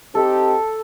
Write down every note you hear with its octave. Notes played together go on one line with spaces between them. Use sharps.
C4 D#4 G4 A4